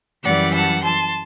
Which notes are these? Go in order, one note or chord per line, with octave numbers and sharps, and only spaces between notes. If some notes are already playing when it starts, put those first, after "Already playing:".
F#2 E3 G3 D5 F#5
F#5 A5
A5 C6